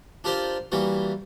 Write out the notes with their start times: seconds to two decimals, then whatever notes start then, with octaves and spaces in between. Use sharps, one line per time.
0.24 D4 F4 G4 A#4 C5 D5
0.72 E3 G3 A#3 F#4